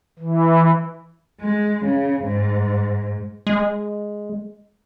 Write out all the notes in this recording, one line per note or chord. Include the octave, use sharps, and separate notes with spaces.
E3
G#3
C#3
G#2
G#3